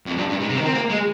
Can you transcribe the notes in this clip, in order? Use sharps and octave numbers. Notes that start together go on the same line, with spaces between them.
F2
G2
G2
G#2
C3
D#3
C4
A#3
G#3